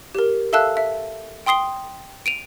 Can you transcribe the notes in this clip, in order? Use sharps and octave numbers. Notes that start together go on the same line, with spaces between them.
G4 A#4
A4 E5 F5 A5 E6 F#6
E5
G5 C6 D#6 C7 G7
D7 D#7 F7